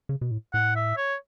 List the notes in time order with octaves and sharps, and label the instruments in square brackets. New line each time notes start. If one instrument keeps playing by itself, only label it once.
[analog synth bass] C#3
B2
A2
[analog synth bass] A2 [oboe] F#5
[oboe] E5
C#5